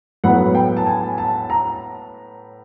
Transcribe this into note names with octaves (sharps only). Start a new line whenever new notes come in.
A2 F#3 B3 F#5
G5
A5
G#5
A5
A#5